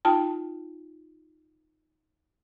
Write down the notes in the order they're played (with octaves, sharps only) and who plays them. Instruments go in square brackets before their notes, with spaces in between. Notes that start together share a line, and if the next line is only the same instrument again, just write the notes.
[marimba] D#4 F4 G5 A5